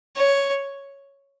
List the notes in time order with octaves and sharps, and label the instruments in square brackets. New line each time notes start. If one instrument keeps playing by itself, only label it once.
[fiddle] C#5